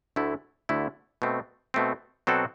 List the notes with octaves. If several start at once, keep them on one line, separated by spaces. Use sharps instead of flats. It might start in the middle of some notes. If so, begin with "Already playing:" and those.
D2 D3 A3 E4
D2 D3 A3 E4
B2 A3 C4
B2 A3 C4
B2 F#3 C4 F#4 A4